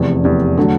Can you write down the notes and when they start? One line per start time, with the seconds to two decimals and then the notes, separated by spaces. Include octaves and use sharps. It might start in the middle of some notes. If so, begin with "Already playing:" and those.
Already playing: F1 E2 C3
0.24 F1 E2 C3
0.57 D3 F#3 A3